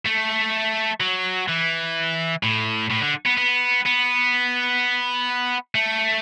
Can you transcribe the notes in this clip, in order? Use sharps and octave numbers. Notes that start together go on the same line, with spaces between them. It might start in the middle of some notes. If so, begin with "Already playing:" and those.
A3
F#3
E3
A2
A2
D3
B3
B3
B3
A3